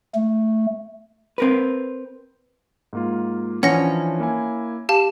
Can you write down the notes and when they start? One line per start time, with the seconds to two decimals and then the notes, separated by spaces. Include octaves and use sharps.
0.14 A3
1.38 C4 A#4 B4
2.93 G#2 A#3 F4
3.63 E3 F3 C#4 D4 F#5 A#6 C#7
4.20 A#3 E4 G#5
4.89 G4 F5 A5